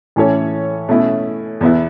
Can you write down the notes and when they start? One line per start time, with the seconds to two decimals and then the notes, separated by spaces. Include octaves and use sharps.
0.16 A2 E3 C#4 A4 C#5
0.88 B2 A3 C#4 E4
1.61 E2 B2 B3 E4